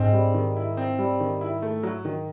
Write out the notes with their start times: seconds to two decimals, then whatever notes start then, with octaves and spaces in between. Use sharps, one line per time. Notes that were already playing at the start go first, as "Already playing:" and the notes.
Already playing: G#2 C4
0.13 G3
0.34 D#3
0.57 E4
0.77 C4
0.99 G3
1.20 D#3
1.41 E4
1.62 A3
1.83 F#3
2.05 D#3